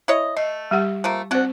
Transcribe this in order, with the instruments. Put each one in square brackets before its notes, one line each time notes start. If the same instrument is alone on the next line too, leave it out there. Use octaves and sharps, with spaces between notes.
[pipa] E4 C#5 D#5
[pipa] A3 [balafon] D#5
[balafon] G3 G4 F#5
[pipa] F3 A3 A#3
[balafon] C4 C5 [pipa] D4 F#4